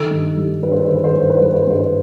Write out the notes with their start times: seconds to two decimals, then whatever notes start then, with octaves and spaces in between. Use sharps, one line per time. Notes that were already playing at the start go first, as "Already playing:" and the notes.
Already playing: D#3 A4
0.11 G2
0.37 G3
0.63 G2 B4
0.72 C5
0.79 B4
0.88 D#3 C5
0.96 B4
1.04 C5
1.13 G2 B4
1.21 C5
1.30 B4
1.37 C5
1.41 G3 B4
1.54 C5
1.62 B4
1.67 G2 C5
1.79 B4